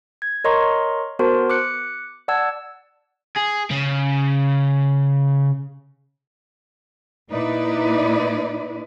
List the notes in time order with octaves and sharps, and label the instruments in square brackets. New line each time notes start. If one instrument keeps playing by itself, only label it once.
[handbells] G#6
A#4 C#5 D#5 A#5 C6 C#6
B3 F#4 A#4 C5 A5 C6
D6 F#6 C#7
D5 F#5 A5 E6 G#6
[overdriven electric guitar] G#4
C#3
[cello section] A#2 D#4 E4 B4 D5